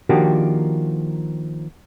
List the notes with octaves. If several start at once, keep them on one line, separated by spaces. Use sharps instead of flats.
D#3 F3 A#3 D4 F#4 G4